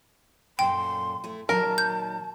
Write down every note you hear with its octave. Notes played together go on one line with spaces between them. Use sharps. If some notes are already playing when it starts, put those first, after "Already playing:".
F#2 A#2 A4 G5 C6
A3 E4
A#2 D#3 F#3 A#4 A5
G6